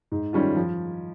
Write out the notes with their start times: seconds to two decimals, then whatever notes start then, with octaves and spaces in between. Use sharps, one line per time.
0.12 G#2
0.33 D#3 G3 C#4 F4
0.56 F3